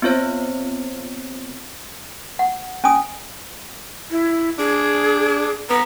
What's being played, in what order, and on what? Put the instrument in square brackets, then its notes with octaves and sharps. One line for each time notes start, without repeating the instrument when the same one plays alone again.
[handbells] B3 C4 F4 C5 C#5
[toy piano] F#5
C#4 G#5 D#6
[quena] E4
[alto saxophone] D4 [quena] G#4
[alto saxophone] B3 [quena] A#5